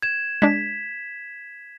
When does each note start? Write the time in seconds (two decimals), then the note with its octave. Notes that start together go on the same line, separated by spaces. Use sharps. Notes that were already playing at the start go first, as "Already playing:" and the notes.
0.02 G#6 E7
0.42 G#3 D4 B6